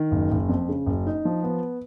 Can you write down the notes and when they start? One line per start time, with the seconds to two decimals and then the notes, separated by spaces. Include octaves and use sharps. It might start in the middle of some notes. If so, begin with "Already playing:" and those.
Already playing: D#3
0.11 F#1
0.31 F#1
0.49 F2
0.69 C#3
0.86 F#1
1.06 D#4
1.25 F3
1.43 B3